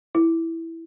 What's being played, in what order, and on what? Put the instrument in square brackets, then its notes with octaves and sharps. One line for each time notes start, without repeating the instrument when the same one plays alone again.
[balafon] E4